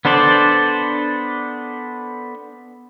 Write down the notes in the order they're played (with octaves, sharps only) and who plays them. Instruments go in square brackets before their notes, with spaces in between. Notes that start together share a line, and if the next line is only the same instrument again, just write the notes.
[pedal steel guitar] B3 D4 A4 C5 D5